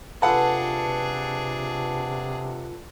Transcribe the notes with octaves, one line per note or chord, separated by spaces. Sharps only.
C3 D4 F4 G#4 A4 B4 F#5 A5